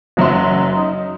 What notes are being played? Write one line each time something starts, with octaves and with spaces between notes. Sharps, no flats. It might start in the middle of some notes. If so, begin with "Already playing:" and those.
F#1 F#3 E5 C6
D#4